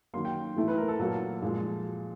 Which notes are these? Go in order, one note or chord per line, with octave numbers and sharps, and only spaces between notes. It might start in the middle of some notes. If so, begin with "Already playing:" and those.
D#3 F#3 A#3 C6
G5
A2 E3 A3
B4
A#4
A4
A#2 F#3 A#3 A4
A#2 F3 G#3